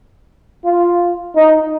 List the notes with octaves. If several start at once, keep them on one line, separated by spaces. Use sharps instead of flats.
F4
D#4